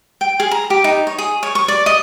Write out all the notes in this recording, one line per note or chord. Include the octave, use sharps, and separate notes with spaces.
G5
G#4
A#5
G4
D#4
C#5
G#4
C#5
C#6
D5
D#5